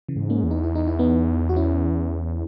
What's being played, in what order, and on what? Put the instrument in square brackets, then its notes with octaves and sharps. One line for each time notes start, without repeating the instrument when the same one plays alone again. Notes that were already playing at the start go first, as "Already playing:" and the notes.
[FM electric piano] C#3 E3
[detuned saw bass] G#2
[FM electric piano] A#3 C#4
[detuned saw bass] E2
[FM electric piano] D#4
E4
D#4
E4
B3 D#4
F#4
C#4 E4